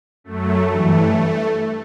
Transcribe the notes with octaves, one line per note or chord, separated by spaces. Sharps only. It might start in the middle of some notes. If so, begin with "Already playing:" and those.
F#2 F#3 A3
G2 E3 A3